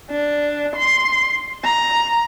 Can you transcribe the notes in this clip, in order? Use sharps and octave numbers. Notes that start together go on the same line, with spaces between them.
D4
C6
A#5